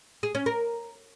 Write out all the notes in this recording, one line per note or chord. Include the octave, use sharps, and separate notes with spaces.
G#4
C#4
A#4